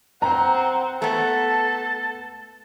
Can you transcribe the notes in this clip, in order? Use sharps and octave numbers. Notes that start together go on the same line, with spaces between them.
C4 F#5 A#5
A3 B3 A4 A5